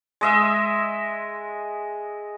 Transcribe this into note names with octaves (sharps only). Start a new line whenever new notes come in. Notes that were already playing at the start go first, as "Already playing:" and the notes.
G#3 D#5 E5